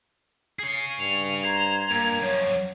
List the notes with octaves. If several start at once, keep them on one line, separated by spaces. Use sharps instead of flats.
G#4 C#5 C7
G2 F7
C5 A#5 G#6
G2 A#3
F#2 F3 C#5